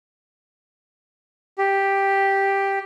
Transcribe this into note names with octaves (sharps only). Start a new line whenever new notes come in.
G4